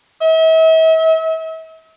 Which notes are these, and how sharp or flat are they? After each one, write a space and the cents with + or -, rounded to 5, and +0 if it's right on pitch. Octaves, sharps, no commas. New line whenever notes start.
E5 -40